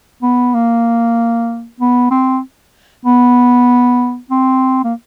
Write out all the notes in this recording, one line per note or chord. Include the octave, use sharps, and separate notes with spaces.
B3
A#3
B3
C4
B3
C4
A#3